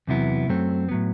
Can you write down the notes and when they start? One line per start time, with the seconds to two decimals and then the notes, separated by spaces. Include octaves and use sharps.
0.07 E2 C3 F#3 B3 E4
0.48 F#2 F#3 A3 C4
0.89 A2 F#3 B3